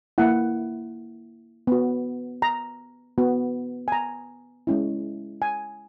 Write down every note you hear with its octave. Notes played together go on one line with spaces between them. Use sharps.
A#3 E4 F#5
B3 F#4
A#5
B3 F#4
G#5
A#5
G#3 C#4 E4
G#5